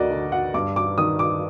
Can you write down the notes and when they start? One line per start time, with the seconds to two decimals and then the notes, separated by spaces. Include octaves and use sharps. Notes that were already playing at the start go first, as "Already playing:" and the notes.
Already playing: D2 D3 F#4 A#4 D5 D#5
0.11 D3
0.32 F#5
0.54 G2 D6
0.76 D6
0.98 D#3 D#6
1.19 D6